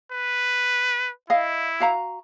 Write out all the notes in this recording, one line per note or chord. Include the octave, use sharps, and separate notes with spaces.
B4
E4 D#5 F5
F#4 F5 A#5